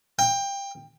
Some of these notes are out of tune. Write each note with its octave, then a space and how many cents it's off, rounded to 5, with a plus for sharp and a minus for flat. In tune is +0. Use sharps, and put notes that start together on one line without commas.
G5 +20